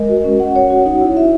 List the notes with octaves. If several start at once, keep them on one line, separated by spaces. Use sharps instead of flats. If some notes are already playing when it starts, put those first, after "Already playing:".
Already playing: G#3 A#4 D#5
F#4
C#4
F#5
C#5
F#4
D#4
E4
E5